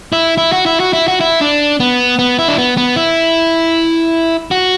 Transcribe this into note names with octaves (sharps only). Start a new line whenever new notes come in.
E4
E4
F#4
E4
F#4
E4
F#4
E4
D4
B3
B3
E4
D4
B3
B3
E4
F#4